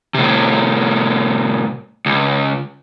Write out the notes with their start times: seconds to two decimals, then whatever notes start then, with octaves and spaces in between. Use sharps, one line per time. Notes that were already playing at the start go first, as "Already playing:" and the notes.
0.14 A2 C3
2.06 C#2